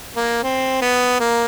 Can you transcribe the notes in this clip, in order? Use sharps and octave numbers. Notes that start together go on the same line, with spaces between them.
A#3
C4
B3
A#3